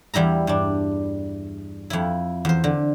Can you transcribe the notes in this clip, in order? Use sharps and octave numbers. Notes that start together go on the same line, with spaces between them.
E2 G3 E4 A#5
G2 D4
F2 E4
E2 C5
D3